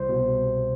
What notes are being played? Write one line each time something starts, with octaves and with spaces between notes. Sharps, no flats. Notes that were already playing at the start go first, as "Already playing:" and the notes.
Already playing: C2 C5
B2